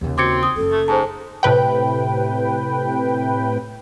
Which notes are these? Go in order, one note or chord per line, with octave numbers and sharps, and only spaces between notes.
D#2 C#3
C4 F#4 D6 G#6 C#7
D#6
F#1 C#4 A4
A3
G#2 C5 A5
A2 C3 B4 G5